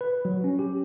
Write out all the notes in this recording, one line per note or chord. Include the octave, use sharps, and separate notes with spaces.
B4
F#3
C#4
G4